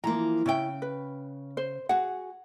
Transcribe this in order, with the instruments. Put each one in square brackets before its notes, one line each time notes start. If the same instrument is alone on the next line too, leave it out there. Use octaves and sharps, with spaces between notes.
[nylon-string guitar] E3 F3 A#3 [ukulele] A#5
[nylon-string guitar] C#3 G5 [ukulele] C#4 E4
[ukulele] B4
C5
[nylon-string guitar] F#4 G#4 [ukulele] F#5